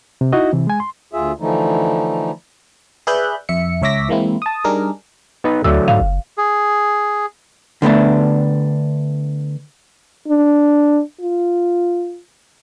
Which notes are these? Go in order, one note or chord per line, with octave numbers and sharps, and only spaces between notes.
C3
D#4 E4 F#4 D#5
C3 E3
G#3 G#5
C6
D2 F4 G#4 E5
D3 E3 F3 A3 D#4
G#4 B4 D5 E5 F#6 G6
F2 E5 C#7
C#2 C#5 E5 D6 A#6 B6
E3 G#3 A#3 C4 E4
A5 D#6
G3 D4 D#4 G#4 A#4
B3 D#4 B4
D2 D3 F#3 A3 E6
G#2 F5
F#1
G#4
D3 A3 B3 D4
D4
F4